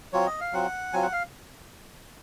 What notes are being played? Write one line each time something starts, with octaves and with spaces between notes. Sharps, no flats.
F#3 C4 F4 C#5
D#5
F5
F#3 C4 F4 F#5
F#3 C4 F4 G#5
F#5
F5